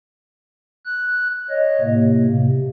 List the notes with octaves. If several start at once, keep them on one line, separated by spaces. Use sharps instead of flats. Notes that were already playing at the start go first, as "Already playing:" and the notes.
F#6
C#5 D#5
A2 C3 A#3
C3